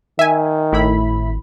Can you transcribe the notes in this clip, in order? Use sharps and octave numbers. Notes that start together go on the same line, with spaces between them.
D#3 E5 G#5
G#1 A2 E4 B5